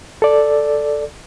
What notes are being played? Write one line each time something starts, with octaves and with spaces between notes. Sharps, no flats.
A4 D5